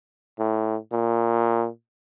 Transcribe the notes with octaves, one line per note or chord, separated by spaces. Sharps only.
A2
A#2